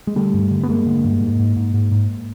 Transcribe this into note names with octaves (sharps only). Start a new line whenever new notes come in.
G#3
D3 G3 A3
G2
D3
B3
G2 G#3 A#3
D3
G2
G#2
G#2
G#2
G#2
G#2